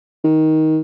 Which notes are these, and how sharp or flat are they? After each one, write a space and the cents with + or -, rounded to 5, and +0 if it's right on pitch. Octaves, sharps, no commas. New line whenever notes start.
D#3 +15